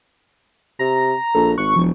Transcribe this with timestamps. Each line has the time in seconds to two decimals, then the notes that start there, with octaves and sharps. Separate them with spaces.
0.79 C3 A#5
1.35 A#1 A4
1.58 G#1 C#6 F#6
1.76 E1 F3